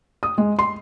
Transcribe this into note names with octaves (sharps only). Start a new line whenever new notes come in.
D#6
G#3
C6